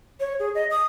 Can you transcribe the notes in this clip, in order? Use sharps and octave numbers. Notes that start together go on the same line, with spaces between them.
C#5
G#4
D#5
D#6